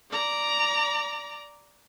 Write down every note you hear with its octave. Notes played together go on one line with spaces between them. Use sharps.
D5 A#5